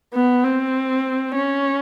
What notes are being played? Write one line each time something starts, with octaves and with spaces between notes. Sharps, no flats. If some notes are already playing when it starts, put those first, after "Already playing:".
B3
C4
C#4